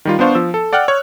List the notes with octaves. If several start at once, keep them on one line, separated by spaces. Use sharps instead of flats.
D#3 G3 F4
B3 D4 C5 F5 C#6
F3 E6
A4
D5 F#5 G5 F6 F#6
C#5